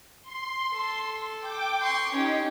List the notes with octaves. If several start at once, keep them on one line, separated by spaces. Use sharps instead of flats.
C6
A4
G5 D6
C6 C#6
C#4 D#4 G4